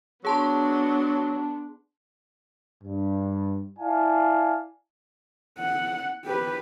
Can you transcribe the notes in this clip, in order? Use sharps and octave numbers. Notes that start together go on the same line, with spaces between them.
F#3 B3 D4 G#4 A5 C6
G2
E4 D5 F5 G#5 A5
F#5
G4 B4